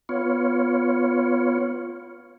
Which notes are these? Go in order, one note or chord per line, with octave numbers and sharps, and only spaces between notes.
B3 F4 C#5